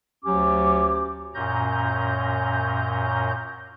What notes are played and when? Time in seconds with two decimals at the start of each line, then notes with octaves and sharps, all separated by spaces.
0.25 D2 F#3 C#4 G4 D6
1.34 F#2 A#2 C#4 A#5 G6